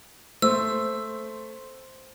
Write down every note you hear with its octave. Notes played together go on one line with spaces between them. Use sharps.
A3 C5 E6